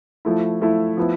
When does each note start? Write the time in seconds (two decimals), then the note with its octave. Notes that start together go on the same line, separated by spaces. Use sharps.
0.25 F3 A3 E4
0.61 F3 A3 E4
0.97 F3 B3 E4